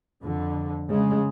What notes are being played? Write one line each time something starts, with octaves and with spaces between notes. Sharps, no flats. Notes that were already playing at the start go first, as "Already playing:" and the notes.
F2 D3
C#3 G#3